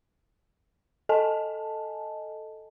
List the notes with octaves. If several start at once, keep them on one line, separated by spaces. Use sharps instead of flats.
A4 D#5 G#5 A5